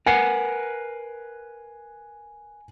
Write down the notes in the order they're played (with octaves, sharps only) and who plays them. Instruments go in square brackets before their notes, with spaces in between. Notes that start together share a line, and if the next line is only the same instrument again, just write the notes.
[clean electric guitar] A#4 B4 F#5 [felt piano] G#5 C7